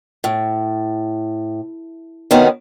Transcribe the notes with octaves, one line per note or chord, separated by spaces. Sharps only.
A2
C3 D#3 B3 C#4 D#4 F#4